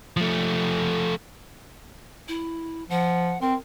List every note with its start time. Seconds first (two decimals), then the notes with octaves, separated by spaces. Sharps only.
0.17 F3 A3
2.28 E4
2.90 F3 F#5
3.41 C4 A#4